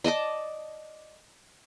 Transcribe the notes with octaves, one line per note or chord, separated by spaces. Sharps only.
D5 D#5 A5 D6